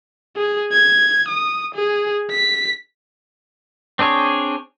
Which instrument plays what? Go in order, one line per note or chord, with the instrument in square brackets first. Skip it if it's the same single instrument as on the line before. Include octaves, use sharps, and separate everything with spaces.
[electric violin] G#4
G#6
D#6
G#4
B6
[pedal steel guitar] C4 D4 G#4 C#5